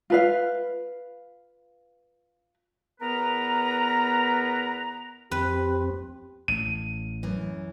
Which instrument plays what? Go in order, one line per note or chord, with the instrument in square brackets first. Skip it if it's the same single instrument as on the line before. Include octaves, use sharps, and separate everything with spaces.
[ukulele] F4 B4 F5
[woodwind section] E2 B3 A#4 B4 A#5
[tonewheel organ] F2 C4 [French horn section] G4 [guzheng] B4
[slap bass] A1 [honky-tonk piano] D#7
[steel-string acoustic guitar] F#2 E3